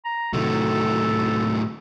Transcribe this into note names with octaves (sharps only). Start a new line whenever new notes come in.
A#5
A2 C3 D#3 F#3 A4